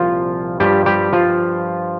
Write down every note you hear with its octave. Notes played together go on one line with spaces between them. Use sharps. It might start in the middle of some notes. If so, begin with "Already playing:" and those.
Already playing: C2 A#2 F3 F4
G2 F3 G3 G4
G3 G4
F3 F4